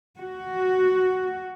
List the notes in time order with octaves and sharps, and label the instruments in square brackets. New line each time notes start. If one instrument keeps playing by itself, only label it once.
[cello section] F#4